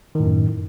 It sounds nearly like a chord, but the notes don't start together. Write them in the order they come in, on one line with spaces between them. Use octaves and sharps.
D#3 A2 F#2